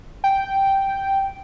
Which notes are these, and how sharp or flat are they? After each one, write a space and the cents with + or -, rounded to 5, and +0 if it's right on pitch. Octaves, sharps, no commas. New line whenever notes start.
G5 -5